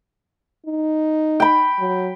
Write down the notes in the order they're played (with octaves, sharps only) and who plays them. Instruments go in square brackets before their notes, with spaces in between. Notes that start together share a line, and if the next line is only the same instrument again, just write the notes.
[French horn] D#4
[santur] G5 B5
[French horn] F#3